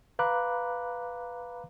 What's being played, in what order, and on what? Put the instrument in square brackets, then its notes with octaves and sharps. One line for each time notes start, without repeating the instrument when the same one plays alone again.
[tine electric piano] B4 F5 A#5 B5 D6 F#6